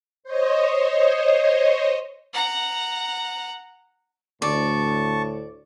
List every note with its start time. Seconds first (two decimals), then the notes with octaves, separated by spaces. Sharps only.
0.24 C5 C#5 D#5
2.34 F#5 A#5
4.42 D2 A2 D5 A5 C#6